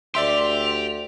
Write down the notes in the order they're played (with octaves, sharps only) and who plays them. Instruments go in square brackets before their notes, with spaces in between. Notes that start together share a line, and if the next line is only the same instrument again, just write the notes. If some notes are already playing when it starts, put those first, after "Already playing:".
[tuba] D2 [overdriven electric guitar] G4 [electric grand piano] D5 E5 C6 [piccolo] F7